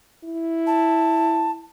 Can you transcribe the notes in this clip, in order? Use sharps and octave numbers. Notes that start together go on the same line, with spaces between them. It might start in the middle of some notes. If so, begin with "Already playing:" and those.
E4
A5